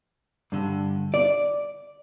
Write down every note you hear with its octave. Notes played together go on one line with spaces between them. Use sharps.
G2 D3
D5